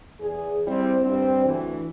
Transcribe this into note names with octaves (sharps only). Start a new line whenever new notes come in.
E2 G#4
G3 C4 E4 C5
G2 G3 C4
D2 E3